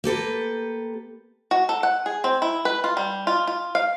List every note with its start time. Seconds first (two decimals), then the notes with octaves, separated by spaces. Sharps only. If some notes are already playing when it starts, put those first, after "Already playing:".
0.04 A#3 G4 A4 B4
1.51 F#4
1.69 A4
1.83 F#5
2.06 G#4
2.24 C4
2.42 E4
2.65 B4
2.84 F4
2.97 G3
3.27 F4
3.47 F4
3.75 F5